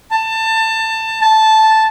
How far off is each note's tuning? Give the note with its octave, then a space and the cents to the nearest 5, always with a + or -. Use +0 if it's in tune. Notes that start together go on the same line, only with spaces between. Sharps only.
A5 +20
A5 -5